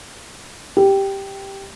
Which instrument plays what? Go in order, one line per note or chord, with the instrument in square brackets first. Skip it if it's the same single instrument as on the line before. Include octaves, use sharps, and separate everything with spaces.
[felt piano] G4